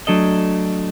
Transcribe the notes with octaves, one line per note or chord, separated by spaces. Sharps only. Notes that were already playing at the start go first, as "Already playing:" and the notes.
F#3 A3 D4 A4 D#5